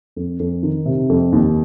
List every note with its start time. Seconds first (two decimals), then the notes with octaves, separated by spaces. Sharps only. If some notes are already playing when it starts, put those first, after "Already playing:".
0.16 F2
0.39 F2
0.63 D#3
0.86 C3
1.09 F2
1.33 D#2